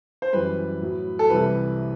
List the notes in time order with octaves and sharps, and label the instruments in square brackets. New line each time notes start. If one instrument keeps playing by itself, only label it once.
[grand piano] C5
F#2 E3 G3 B4
A2 F#3
A4
C2 C3 E3 G3 B4